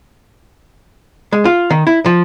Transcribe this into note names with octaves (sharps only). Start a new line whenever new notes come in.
G#3
F4
D#3
E4
F3